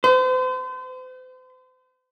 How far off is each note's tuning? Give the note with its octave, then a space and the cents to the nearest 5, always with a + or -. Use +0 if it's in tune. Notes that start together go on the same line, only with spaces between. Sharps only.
C5 -40